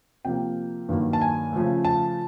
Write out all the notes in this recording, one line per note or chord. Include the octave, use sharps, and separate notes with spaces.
C3 F3 A#3 G5
G2 D#3 F#3 A#3
A5
G#5
C#3 F3 A3
A5